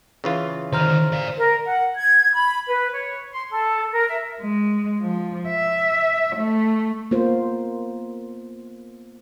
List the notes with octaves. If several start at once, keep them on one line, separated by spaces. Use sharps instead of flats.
C#3 E3 F4
D3 D#3 C5 A#5 F6
D5 F5
A#4
F#5
G#6
B5
B4
C#5
C6
A4
A#4
E5
G#3
F3
E5
A3
A#3 B3 F4 C5